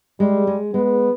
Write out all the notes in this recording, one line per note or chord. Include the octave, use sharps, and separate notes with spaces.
G3 G#3
G#3
G#3 B3